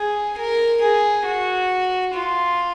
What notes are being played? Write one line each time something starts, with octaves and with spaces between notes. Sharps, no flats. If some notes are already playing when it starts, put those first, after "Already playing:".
Already playing: G#4
A#4
G#4
F#4
F4